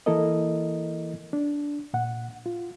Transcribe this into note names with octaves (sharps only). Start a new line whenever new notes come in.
E3 A#3 E4 A4 A#4 D#5
D4
A#2 F#5
F4